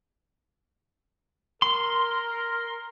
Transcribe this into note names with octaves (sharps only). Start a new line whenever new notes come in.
A#4 C6